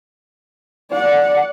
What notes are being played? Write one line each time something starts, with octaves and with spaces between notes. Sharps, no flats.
D5 F#5